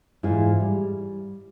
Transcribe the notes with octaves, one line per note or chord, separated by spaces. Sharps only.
G#2 E3 E4 F4 G#4
G3